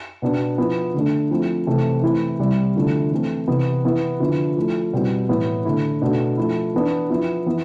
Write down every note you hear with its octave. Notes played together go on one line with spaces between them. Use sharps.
B2 B3 D4
F3 B3 E4
D3 A3 D4
F3 A3 C4 E4
C3 E3 A3 C4
E3 A3 C4 E4
C3 G3 C4 E4
D3 F3 A3 E4
E3 A3 C4
C3 E3 B3
E3 B3 E4
D3 F3 B3 E4
F3 A3 E4
B2 G3 C4 E4
A2 E3 B3 E4
D3 A3 E4
B2 A3 D4
F3 A3 E4
E3 B3 D4
F3 B3 E4
E3 B3 E4